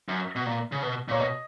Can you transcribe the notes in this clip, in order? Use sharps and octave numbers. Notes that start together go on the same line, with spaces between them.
F#2
B2
A#2
C#3
B2
A#2 C#5
B2 D#5